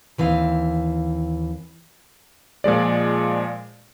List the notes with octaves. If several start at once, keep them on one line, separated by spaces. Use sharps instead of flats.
D#2 E3 C4 F5
A#2 F3 G#3 D5